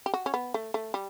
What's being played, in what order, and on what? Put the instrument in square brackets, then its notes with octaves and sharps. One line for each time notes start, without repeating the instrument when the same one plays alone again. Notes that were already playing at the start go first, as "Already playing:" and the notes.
[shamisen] G4
F#4
C#4
B3
A3
A3
G3